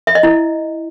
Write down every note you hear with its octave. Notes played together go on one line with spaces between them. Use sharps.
E5
D#5
E4